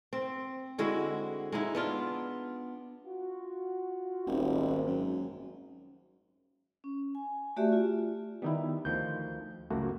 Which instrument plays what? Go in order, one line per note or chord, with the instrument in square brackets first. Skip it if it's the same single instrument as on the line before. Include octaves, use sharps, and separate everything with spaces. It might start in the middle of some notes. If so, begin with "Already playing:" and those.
[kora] C4
D3 G#3 E4 F#4
G#3 D#4 E4
B3 D4 F4
[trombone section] F4 F#4
[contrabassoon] D#1 [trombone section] G#1
[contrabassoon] F#2
[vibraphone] C#4
G#5
A3 F#4 G4 D5 E5
F4
[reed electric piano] D#3 B3 [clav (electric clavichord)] G3 D#4 E4
[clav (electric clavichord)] D2 D#3 F3 [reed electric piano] G6
[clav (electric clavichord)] C#2 F#2 [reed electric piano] A3 A#3 F#4